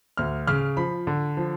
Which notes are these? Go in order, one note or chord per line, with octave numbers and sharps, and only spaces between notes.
D2 F6
C#3 F6
F3 B5
D3
F3